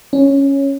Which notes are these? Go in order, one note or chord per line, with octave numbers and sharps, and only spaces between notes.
C#4